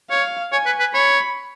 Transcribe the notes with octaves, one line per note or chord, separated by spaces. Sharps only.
C#5 F5
C#5 G#5
B4
B4
C#5 B5